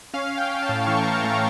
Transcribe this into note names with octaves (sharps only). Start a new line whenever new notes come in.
C#4 F5
C#4
G5
C#4
A5
A2
E3 C#6
E3 A#5
A5
A3
A#5